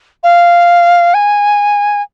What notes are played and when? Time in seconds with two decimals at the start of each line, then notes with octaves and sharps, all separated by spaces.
0.24 F5
1.14 G#5